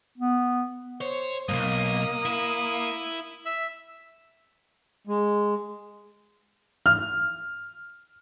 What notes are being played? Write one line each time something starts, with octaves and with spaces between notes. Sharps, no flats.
B3
C5 C#5
B1 G2 A#3 D#6
E4
E5
G#3
F6